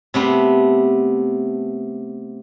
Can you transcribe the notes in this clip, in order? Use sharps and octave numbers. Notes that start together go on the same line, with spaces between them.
C3 A3 B3